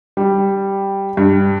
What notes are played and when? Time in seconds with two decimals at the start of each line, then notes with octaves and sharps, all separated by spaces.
0.17 G3
1.17 G2